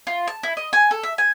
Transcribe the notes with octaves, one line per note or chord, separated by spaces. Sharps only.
F4
A5
E4
D#5
G#5
A4
E5
G#5